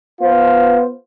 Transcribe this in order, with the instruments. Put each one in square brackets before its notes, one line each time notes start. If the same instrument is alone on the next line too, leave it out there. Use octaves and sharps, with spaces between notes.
[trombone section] B3 F4 C5